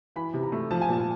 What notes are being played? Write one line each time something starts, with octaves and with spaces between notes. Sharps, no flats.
E3 B5
C3
A#5
A3
F3 A5
G#5
A#2 A5